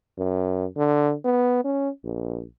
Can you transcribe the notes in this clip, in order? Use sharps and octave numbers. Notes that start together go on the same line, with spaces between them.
F#2
D3
B3
C#4
A#1